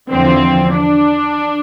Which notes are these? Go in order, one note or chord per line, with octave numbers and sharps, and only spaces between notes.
E2 D3 F3 C4
D4